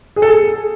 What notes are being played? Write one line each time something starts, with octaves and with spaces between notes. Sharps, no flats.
G#4
A4
G#4